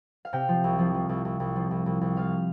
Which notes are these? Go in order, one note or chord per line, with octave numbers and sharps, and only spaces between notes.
F5
C3 G5
F3
C2
F3
F3
C2
C2
C2
F3
C2
C2
C2
F3 F5